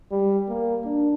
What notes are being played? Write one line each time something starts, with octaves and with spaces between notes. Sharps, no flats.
G3
A#3
D4